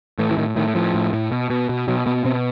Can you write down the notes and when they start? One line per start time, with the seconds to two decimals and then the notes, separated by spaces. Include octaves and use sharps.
0.19 A2 E3
0.31 E3
0.38 A2 D#3
0.56 A2 D#3
0.75 A2 F3
0.94 A2
1.13 A2
1.32 B2
1.50 B2
1.69 B2
1.88 B2 F#3
2.06 B2 B3
2.24 B2 C4